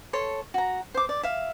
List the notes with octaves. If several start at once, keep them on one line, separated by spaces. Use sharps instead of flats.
A4 C#5 C6
F#4 A#5
C5 D6
D5
E5 F5